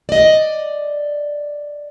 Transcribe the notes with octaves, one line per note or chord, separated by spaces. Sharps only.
D5 D#5